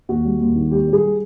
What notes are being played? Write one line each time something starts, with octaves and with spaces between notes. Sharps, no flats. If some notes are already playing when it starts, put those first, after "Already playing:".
D#2 F#4
G3
D#2
D#3
G3 G4
G3
G#4